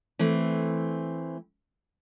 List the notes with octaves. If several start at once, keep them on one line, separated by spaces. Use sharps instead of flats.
E3 A3 C4